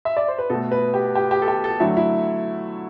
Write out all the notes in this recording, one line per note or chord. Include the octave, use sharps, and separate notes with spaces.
E5
D5
C5
B4
B2 A3 A4
B4
G4
G4
G4
A4
G4
A4
D3 F#3 A3 E4
E4